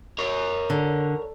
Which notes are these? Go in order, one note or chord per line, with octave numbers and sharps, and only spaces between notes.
A#4 C#5
D3